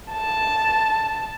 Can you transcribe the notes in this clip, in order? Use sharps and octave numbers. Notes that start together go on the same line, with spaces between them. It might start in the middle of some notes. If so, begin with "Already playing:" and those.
A5